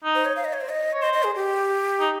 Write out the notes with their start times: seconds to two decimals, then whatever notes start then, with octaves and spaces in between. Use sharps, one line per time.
0.04 D#4
0.15 C5
0.25 C#5
0.36 F5
0.45 D#5
0.53 C#5
0.61 C5
0.69 D#5
0.93 C#5
1.02 C5 D#5
1.13 D#5
1.24 G#4
1.35 G4
2.00 D#4